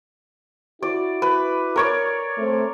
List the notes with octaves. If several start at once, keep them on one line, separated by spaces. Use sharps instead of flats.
E4 F#4 D5
B4
A#4 C#5 D5
A3 C4